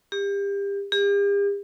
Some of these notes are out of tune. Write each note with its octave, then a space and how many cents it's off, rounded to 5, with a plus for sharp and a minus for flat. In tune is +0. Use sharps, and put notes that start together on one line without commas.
G4 +30
G4 +45